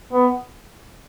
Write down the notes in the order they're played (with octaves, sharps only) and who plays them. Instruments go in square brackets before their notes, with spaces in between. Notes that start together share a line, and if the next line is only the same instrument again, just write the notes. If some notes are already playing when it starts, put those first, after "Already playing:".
[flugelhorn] B3